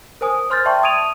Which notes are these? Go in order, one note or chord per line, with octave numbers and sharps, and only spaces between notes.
A#4 C5 G#5 D#6
C5 C6 F6 G6 A6
D5 E5 G5 A5 C6 C#6
D#6 G#6 D7 D#7 F7